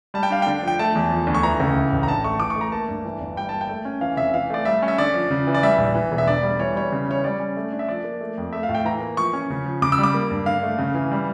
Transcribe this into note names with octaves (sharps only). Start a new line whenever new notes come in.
G3 A5
G5
D4 F5
D3 G5
F3 G5
A3 A5
E2
F3
D2
C#6
E3 A#5
C#2
E3
A1
A#5
D3 A5
A3 C#6
E3 D6
C#6
A3
A#5
A#3 A5
G2
E3
G1
G3 G5
A#3 A5
G5
A3
C#4
E3 F5
F1 E5
E3 F5
A3 D5
G3 E5
C#4
E5
D3 D5
F3
C#3
E3
D5
G3 E5
A#1
E3
E1
E5
D3 D5
G3
E3 C#5
G3 C#5
C#3
E3 C#5
G3 D5
C#4
A3
D4
E5
F3 D5
A#3
A3
F2
A3 E5
F5
A2
G5
E3 A#5
A#3
F3 C#6
C#4
C#3
F3
C#3 D6
E6
G3
D6
A#3
G2
D3 F5
A3
C#3
E3
G3